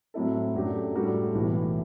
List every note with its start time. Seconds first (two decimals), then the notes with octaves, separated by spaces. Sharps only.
0.14 A2 F#3 C4 E4 A4
0.54 F#2 F#3 A3 D4 G4
0.95 A2 G3 D4 F#4 A4
1.35 B1 A2 E3